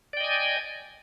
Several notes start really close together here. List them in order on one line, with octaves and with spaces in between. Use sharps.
D5 G5 D#5 G#5